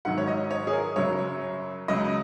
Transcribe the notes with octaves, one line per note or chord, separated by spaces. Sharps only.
G#2 D#3 F#3 F#5
C#5
D#5
C#5
G#4
A#4
F#2 C#3 F#3 C#5
C#2 C#3 F#3 D#5